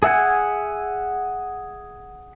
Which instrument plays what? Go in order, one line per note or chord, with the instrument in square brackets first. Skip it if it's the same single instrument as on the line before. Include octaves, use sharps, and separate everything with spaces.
[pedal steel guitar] G#4 E5 F#5 G#5